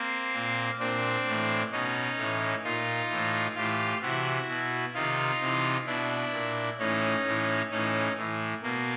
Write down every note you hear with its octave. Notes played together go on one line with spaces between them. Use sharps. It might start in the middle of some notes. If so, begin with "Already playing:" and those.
Already playing: A#3 C4
A#2
A#2 C4 D4
A2 E3
B2 C#4 D#4
A2 E3
A#2 D#4 F4
A2 E3
A2 E3 F4 G4
C3 E3 E4 F#4
B2
C3 D#3 D#4 F4
C3 E3
B2 D4 E4
A#2
A2 E3 C#4 D#4
A2 E3
A2 E3 C#4 D#4
A2 E3
B2 A#3